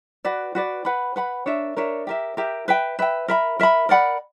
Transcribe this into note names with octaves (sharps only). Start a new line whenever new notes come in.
F#4 B4 D5
F#4 B4 D5
B4 F#5 B5
B4 F#5 B5
D4 A#4 C#5 E5
D4 A#4 C#5 E5
G4 A#4 E5
G4 A#4 E5
B4 E5 G5
B4 E5 G5
A#4 E5 B5
A#4 E5 B5
A#4 D5 F#5 B5